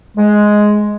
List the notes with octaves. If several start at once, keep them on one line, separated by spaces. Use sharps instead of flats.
G#3